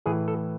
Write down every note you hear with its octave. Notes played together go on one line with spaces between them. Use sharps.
A2 E3 G#4
A4